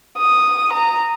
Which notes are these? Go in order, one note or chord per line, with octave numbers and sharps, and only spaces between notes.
D#6
A#5